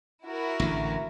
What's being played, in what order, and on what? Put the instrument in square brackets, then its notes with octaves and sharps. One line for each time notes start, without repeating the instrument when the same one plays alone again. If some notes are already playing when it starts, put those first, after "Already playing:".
[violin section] E4 F#4 A#4
[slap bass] A1 D3